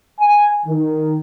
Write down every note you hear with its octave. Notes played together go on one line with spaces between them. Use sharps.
G#5
D#3